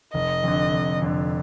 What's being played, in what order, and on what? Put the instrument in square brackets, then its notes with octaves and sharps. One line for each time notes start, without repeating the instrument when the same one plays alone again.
[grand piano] F1 [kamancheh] D#5
[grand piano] F2 D3
F1
F2 D3